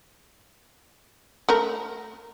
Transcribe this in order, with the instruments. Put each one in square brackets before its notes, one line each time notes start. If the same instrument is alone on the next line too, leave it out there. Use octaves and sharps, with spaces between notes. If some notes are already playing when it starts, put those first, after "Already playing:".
[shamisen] A3 A#4